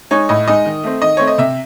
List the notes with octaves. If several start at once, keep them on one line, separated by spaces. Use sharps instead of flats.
G#3 D#4 C#5
A2 D#5
G#3 D#4 D#5
D#3
A3 C4
D#3 D#5
A3 C4 C#5
D#5
C3 E5